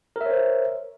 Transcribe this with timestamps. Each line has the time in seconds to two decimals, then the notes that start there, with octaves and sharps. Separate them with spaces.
0.16 A#4
0.21 E5
0.26 C#5
0.30 C5